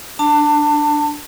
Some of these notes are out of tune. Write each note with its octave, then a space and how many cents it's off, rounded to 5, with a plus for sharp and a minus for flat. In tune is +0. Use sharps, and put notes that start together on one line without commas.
D4 +0 A5 +25